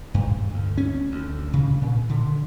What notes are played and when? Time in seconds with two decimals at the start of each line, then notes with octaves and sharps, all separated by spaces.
0.14 G2
0.54 D2
0.77 C#4
1.12 D2
1.53 C#3
1.81 A#2
2.09 D3